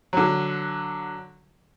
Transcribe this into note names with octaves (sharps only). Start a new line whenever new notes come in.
D3 F#3